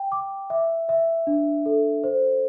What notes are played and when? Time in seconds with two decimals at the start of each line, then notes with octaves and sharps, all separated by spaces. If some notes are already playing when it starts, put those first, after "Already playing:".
Already playing: G5
0.12 D6
0.50 E5
0.89 E5
1.27 D4
1.66 A4
2.04 C5